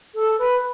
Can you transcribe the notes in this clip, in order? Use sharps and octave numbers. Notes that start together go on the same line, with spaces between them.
A4
B4